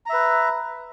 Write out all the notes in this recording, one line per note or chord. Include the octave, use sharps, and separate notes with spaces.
B4 E5 A#5